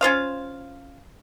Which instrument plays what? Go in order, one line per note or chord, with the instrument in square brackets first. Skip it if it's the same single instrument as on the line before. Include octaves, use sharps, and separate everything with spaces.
[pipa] C#4 F4 C5 F5